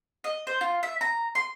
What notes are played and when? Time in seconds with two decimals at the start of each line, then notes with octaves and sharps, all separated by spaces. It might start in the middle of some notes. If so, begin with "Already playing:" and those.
0.24 D#5
0.47 C5
0.61 F4
0.83 E5
1.01 A#5
1.35 C6